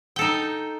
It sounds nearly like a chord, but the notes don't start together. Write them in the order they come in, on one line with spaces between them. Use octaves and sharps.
G5 A4 D#4